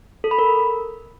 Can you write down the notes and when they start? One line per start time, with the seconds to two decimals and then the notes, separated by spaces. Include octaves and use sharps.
0.24 A4
0.31 B5
0.39 A#4